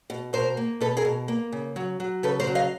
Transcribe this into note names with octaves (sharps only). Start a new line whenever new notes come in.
B2
B2 A#4 C5
A#3
B2 A4 B4
G#4 A#4
B2
A#3
C#3
F#3
F#3
C#3 A4 B4
A#4 C5
F#3
D#5 F5